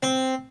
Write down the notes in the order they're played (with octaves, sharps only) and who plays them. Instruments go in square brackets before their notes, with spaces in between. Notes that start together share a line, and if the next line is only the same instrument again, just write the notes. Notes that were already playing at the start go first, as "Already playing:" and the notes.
[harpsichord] C4